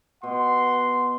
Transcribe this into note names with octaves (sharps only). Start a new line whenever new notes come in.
B2 F#5 C6